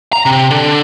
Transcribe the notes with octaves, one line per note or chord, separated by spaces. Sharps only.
A#5
C3
D3